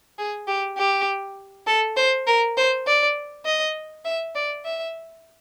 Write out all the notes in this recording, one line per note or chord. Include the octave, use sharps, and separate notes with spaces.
G#4
G4
G4
A4
C5
A#4
C5
D5
D#5
E5
D5
E5